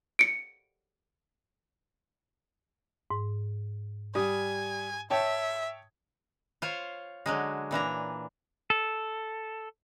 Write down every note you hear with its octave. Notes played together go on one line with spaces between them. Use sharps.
C#7 D7
G#2
G3 G#5 D#6
C#5 E5 G5 A5
F4 C5 C#5
D3 F#3 G#3
A#2 E3 D4 A#5
A4